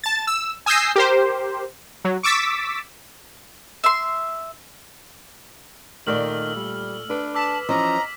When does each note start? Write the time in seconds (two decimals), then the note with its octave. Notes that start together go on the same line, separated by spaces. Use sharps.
0.04 A5 A6
0.27 E6
0.66 G#5 D#6 E6 G6 A#6 C7
0.96 G4 A#4 C5
2.05 F#3
2.23 C#6 D6 E6 A6 B6
3.84 E5 C6
6.07 A#2 D#3 A3 D5 E6 F6 F#7
6.56 G3
7.10 D4 B4
7.35 A5 D6 E6 B6
7.69 E3 F3 C#4 D#5 A#5